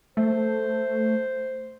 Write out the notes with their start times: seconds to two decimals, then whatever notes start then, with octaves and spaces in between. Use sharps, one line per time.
0.17 A3 C5